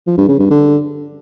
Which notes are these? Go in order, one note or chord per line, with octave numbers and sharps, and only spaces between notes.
F3
G2
C#3
G2
D3